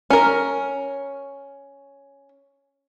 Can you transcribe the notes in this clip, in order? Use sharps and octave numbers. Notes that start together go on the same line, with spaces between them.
C#4 A#4